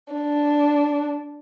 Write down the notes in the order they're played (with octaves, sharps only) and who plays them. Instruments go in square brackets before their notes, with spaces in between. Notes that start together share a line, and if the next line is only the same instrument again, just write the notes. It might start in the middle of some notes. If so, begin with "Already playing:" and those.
[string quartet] D4